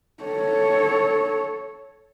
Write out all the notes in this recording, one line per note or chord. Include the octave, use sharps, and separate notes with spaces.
A4 C#5